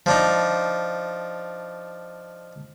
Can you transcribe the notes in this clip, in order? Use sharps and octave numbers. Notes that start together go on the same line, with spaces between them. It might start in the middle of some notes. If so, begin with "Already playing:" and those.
F3 D4 D#4